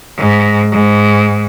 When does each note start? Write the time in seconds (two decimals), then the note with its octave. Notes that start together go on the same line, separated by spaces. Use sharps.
0.17 G#2
0.72 G#2